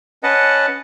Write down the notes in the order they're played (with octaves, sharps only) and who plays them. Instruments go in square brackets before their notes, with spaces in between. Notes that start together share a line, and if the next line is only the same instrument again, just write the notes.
[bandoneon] C#4 B4 D#5 F#5 A5